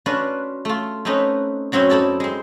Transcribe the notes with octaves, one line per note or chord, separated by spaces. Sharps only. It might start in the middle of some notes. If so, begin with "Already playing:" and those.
C#4 D4 F4 F#4 B4
A3 F4
A3 C4 C#4 D#4 B4
F#2 F#3 C4 C#4 E4
D#4 E4 A4 D5 E5
G#3 C4